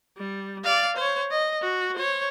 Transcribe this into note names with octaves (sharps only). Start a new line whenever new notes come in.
G3
D5 F5
C5 C#5
D#5
F#4
C5 C#5